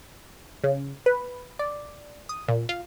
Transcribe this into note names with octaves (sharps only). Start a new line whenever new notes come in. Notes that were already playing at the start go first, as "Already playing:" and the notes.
C#3
B4
D5
D#6
A#2
F4